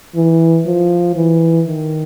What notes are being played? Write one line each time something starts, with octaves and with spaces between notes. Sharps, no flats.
E3
F3
E3
D#3